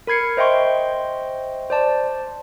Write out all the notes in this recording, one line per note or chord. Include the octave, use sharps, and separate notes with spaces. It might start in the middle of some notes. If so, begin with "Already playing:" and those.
A#4 B5 G#6 C7 C#7
C5 D#5 E5 G5 C6 C#6
C5 D5 A5